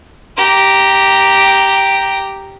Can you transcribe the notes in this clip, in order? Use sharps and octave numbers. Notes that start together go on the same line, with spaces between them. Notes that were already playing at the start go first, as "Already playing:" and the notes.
G4 A#5